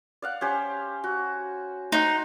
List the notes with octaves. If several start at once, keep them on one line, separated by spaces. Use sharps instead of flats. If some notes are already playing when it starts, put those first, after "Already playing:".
D5 F5 F#5
C#4 G4 C5
F#4
D#4 C5 F#5